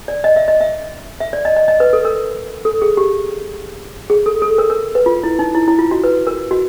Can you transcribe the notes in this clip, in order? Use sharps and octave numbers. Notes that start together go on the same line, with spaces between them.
D5
D#5
E5
D#5
E5
E5
D5
D#5
D#5
D#5
B4
A4
A#4
A4
G#4
G4
G#4
A4
A4
A#4
A#4
B4
F4
E4
D#4
E4
E4
F4
F#4
B4
A#4
F#4